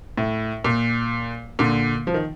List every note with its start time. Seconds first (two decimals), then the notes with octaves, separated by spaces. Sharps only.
0.18 A2
0.64 A#2
1.59 A#2 D3
2.07 F3
2.14 D#3